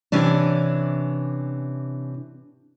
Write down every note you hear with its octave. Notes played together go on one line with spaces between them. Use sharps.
C3 E3 C#4 D4